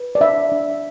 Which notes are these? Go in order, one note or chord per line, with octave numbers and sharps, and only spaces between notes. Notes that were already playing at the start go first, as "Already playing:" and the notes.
Already playing: B4
D5
D4 E5
D4